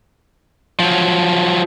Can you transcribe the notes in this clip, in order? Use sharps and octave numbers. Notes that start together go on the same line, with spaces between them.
F3 F#3